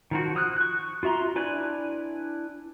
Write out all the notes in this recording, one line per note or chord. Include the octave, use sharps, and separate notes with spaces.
D#3 F3 F#4
F3 D#6 F6 F#6
C#6 F#6
F4 F#4 E5 A#5 C6
D4 E4 B4 D5 G#5